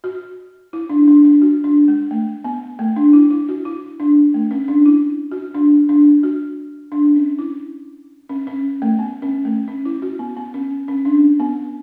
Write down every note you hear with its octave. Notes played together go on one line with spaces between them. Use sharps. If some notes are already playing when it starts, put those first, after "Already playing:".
F#4
E4
D4
D4
D4
F#4
D4
G#3
A3
B3
A3
D4
E4
E4
F#4
E4
D4
A3
C#4
D4
E4
F#4
D4
D4
F#4
D4
C#4
E4
C#4
C#4
A3
B3
C#4
A3
C#4
E4
F#4
B3
B3
C#4
C#4
D4
B3